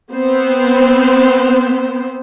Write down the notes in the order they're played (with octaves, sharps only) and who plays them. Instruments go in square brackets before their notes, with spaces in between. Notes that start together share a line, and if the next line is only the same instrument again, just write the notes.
[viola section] B3 C4 C5